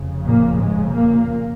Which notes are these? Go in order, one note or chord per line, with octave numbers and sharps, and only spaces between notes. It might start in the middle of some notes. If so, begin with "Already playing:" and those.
Already playing: F1 F2 C#3
A#2 A#3
G#2 G#3
A#2 A#3